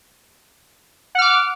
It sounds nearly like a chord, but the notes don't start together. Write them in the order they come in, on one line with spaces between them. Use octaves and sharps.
F#5 F6 D6